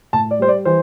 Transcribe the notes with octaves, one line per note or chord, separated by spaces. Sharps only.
A2 A5
D5
G3 C5
D5
E3 C5